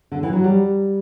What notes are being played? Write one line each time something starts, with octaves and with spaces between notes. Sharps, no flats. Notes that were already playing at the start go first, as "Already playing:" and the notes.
D3
E3
F#3
G3